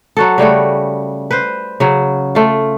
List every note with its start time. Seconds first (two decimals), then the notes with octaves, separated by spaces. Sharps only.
0.17 F#3 F#4 A4
0.38 C#3 G3 A3 F#4
1.31 B4 C5
1.80 C#3 F#3
2.35 A3 F4